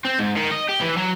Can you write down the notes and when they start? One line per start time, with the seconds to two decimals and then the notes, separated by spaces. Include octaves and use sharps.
0.05 C4
0.19 G#2
0.37 D#3
0.52 D#5
0.69 G4
0.81 E3
0.98 F#3